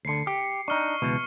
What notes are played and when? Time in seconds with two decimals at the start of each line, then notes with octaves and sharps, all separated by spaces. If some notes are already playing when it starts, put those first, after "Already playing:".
0.05 D2 D3 C7 C#7
0.27 G4
0.68 D4 D#4 C#6 F6
1.02 C#2 B2 E3